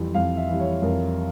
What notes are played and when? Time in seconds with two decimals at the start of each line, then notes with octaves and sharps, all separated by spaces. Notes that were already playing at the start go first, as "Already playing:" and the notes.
Already playing: F2 E3 G3
0.15 F2 F5
0.37 E5
0.49 E3 G3
0.60 C#5
0.82 F2 A#4